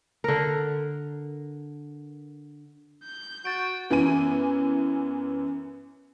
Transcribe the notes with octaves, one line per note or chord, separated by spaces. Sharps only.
D3 A#4
G6
F#4 A6 D7
F#2 E3 B3 G#5 D#7